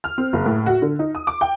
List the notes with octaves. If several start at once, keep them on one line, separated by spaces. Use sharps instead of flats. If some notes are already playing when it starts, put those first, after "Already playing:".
F6
C4
F#1
A2
F#4
D3
D#4
D#6
D6
G5